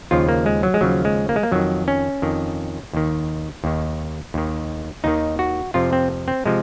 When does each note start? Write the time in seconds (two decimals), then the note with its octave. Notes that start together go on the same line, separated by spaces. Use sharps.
0.11 D#2 C#3 F3 F4
0.29 A#3
0.46 G#3
0.63 F#3
0.74 G#3
0.81 D#2 C#3 F3 F#3
1.05 G#3
1.29 A#3
1.36 G#3
1.43 A#3
1.51 F2 D#3 F#3
1.88 C#4
2.22 F2 D#3
2.93 D#2 D#3
3.64 D#2 D#3
4.34 D#2 D#3
5.04 D#2 D#3 D#4
5.39 F#4
5.74 F2 C3 F3 F4
5.93 C4
6.28 C4
6.46 C3 F3 G#3